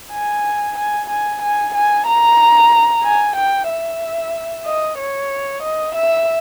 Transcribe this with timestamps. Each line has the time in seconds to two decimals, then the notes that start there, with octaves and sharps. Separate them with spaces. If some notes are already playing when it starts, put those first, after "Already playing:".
0.13 G#5
0.78 G#5
1.09 G#5
1.42 G#5
1.74 G#5
2.07 A#5
3.04 G#5
3.36 G5
3.69 E5
4.66 D#5
4.98 C#5
5.62 D#5
5.95 E5